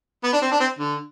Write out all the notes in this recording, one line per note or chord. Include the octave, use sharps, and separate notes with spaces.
B3
D4
C4
D4
C4
D3